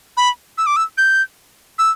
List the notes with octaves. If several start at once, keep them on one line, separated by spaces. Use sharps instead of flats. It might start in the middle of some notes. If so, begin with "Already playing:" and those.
B5
E6
D6
E6
G6
E6